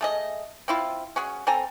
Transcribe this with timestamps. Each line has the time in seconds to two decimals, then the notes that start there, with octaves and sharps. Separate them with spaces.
0.01 A3 G#4 D#5
0.68 C4 E4 F4
1.16 C#4 F#4 G#4
1.47 C4 A4 G#5 A#5